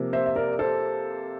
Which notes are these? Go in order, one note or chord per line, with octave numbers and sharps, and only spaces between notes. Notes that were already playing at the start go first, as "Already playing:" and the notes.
Already playing: C3 F3 A#3
C5 E5
E5
A#4 D5
A4 C5